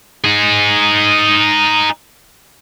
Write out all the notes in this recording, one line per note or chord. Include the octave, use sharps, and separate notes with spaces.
D#4 G#4